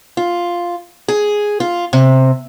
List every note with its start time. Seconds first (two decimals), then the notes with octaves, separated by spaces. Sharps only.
0.17 F4
1.08 G#4
1.60 F4
1.93 C3